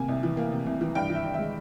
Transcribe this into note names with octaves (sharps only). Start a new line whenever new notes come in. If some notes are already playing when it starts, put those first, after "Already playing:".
Already playing: C3 A#3 G#5
C2
E3
A#3
C3
C2
E3
G2 G5
E3
E5
G2
G#3 E5